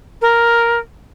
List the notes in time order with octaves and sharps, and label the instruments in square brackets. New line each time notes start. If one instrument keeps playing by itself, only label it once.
[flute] A#4